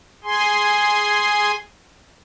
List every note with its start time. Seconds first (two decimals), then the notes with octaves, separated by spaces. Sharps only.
0.24 G#4 G#5 C6